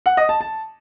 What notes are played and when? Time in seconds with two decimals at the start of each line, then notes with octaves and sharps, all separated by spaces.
0.06 F#5
0.17 D#5
0.29 A5
0.41 A5